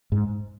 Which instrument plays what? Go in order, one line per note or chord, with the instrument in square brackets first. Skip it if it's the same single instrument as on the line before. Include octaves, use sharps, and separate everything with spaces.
[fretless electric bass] G#2